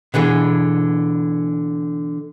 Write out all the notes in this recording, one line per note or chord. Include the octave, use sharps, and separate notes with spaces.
B2 D3 E3 G#4